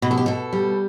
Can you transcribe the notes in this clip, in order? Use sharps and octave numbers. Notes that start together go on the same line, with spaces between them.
B2 B4
A4
G4
B2 A4
G3